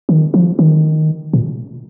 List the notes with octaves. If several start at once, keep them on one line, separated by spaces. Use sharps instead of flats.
D#3
F3
D#3
A#2